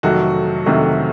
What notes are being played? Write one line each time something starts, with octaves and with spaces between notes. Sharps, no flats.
F2 C3 D#3 F#3 A3 F#4
F2 C3 D#3 F#3 A3